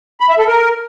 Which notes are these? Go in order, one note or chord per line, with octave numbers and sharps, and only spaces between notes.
B5
E5
A4
A#4